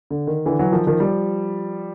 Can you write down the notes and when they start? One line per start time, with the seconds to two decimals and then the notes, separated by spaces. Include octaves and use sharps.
0.11 D3
0.27 D#3
0.46 D3 E3
0.59 E3 F#3
0.72 D#3 F3
0.87 D#3 F3
1.00 F3 G3